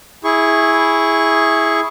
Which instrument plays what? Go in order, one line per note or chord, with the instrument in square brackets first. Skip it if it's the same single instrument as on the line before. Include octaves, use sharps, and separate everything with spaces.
[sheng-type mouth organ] E4 G#4 C#6